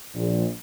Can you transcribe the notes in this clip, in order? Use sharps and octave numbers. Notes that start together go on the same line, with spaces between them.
A#1